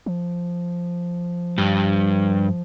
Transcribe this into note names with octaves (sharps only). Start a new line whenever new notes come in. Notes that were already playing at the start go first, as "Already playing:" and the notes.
F3
G2